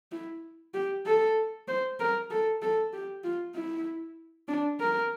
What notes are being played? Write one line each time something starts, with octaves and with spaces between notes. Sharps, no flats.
E4
G4
A4
C5
A#4
A4
A4
G4
F4
E4
D4
A#4